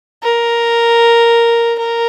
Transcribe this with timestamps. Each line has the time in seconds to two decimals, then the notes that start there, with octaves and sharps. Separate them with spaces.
0.24 A#4
1.79 A#4